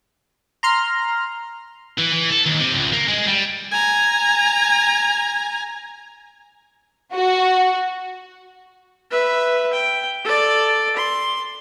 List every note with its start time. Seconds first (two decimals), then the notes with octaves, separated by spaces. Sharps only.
0.63 A#5 C6 F6
1.98 E3
2.13 E3
2.30 A4
2.46 D#2
2.60 C3
2.73 C#2
2.93 A#3
3.08 G#3
3.27 G3
3.72 G#5 A#5
7.13 F#4
9.11 B4 E5
9.73 G5
10.24 A4 D5
10.97 C6